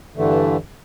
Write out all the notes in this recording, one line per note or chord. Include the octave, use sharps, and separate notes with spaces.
G2 D3 E3 A3